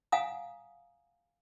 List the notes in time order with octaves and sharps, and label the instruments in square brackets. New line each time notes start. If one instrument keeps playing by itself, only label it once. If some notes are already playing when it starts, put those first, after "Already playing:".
[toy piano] F5 F#5 G#5 A#5 D#6